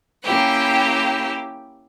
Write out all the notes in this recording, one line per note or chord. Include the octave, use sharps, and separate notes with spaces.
A#3 C#4 E4 G4 G5